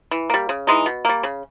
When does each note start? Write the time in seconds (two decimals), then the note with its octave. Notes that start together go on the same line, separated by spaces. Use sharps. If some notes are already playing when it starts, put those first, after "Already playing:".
0.11 E3
0.30 G3 A#3
0.49 C#3
0.67 E3 G#3 D#4
0.86 B2
1.05 G3 A#3
1.23 C#3